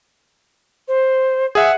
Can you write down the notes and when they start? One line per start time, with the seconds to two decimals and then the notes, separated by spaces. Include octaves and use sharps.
0.88 C5
1.55 G#4 E5 F#5